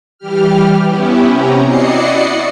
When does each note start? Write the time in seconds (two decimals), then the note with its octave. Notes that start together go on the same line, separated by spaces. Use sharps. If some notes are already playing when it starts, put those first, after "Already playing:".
0.18 E3 G3 G4 F6
0.85 B3 C#4 E4 G4
1.30 C3 C#4 G4 A#5
1.65 E4 F#4 D5 D#5 C7 C#7